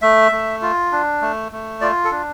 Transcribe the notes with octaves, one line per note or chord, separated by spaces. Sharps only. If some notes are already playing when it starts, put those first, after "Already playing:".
A3 E5
A3
F4
D4
A3
A3
F4 D5
A4
D4